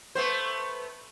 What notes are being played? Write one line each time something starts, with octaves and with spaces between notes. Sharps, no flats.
A3 B3 C5